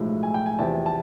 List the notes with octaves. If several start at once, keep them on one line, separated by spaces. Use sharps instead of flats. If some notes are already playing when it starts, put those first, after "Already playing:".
Already playing: B1 A2 F3 G#3
G#5
G5
G#5
E2 C3 F3 A5
A5